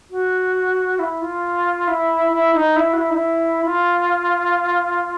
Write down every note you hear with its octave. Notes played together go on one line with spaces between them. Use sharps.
F#4
E4
F4
E4
E4
D#4
E4
F#4
E4
D#4
E4
F4